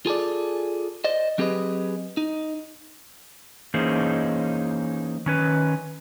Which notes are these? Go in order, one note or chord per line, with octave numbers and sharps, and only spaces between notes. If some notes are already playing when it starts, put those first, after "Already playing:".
F4 G#4 A4 D5
C5 D5 D#5
F#3 C4 G4 G#4 B4 D#5
D#4
E3 A#3 C#4 D#4 G#4 C5
D#3 C#4 B4